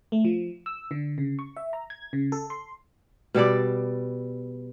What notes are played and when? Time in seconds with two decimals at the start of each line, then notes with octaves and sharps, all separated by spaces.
0.12 A3
0.25 F3
0.66 E6
0.91 D3
1.18 C#3
1.39 C#6
1.57 E5
1.73 A#5
1.90 G#6
2.13 C#3
2.32 A4
2.50 C6
3.34 B2 G3 A4 D5